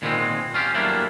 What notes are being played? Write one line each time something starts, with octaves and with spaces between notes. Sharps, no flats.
A#2 D#3 G3 G#3 B3 C4
C#4 F4 G4
G2 F#3 A3 A#3 D4 E4